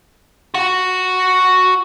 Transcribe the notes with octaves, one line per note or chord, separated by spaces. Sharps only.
F#4 F#5